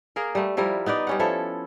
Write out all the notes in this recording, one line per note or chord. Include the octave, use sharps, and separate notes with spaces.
A#3 G#4 A#4
G3 A3
F3 G3 E4 A#4
B3 D#4 B4 D5
G3 C#4 F#5
F3 E4 A4 C#5